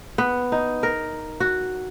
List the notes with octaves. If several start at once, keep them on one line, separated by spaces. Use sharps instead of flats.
B3
D#4
A#4
F#4